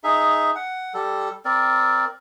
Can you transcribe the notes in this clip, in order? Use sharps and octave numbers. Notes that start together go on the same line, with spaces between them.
D#4 G#4 E5
F#5
G3 A4
C4 A#4 D5